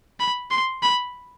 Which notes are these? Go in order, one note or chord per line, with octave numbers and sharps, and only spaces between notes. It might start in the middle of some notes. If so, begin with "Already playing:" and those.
B5
C6
B5